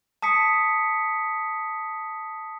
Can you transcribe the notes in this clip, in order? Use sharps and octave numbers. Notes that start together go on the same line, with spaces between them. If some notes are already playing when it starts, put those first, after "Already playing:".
A5 D#6 B6 C#7